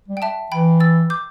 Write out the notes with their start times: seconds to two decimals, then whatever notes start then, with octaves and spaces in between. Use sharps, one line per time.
0.08 G3
0.17 G5
0.22 E5 A5
0.52 E3 G5 B5
0.80 E6 A6
1.10 D6 G6